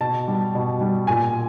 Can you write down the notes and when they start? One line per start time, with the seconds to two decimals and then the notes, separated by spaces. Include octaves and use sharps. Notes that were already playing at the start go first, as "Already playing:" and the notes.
0.01 B2 A5
0.28 G3
0.55 B2
0.81 G3
1.07 A#2 G#5